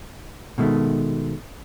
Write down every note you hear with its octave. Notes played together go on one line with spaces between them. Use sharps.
B2 D#3 G#3 A3